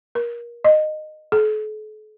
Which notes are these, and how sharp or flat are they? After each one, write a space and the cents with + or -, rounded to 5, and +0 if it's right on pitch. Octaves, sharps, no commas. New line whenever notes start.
A#4 +25
D#5 -15
A4 -45